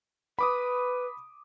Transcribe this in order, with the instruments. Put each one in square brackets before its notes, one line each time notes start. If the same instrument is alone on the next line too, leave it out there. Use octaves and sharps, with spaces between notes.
[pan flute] B4 [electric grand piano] B5 D6 D#6